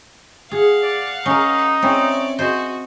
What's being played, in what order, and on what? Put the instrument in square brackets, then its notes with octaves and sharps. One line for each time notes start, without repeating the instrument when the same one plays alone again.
[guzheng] G#4 [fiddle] F5 F#5
[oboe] D5
[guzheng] C#4 A#4 [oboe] D#4
[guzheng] C4 C#4 E4 [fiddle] C#5 D5
[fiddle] F#4 D#5 [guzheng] C5 G#5